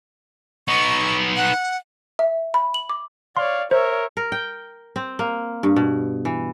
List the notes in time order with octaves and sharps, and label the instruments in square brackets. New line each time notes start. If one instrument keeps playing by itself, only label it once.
[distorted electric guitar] B3 D#4 [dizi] C#6
[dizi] F#5
[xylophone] E5
B5
F#7
D6
[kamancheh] C#5 D5 [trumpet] F5 [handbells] C6
[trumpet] A#4 [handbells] C5 [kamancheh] C#5 E5
[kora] A#4
G5
C4
A#3
G2
B2
E3